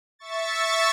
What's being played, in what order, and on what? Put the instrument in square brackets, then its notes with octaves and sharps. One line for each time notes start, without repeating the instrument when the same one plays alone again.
[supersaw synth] E5 C#6 A6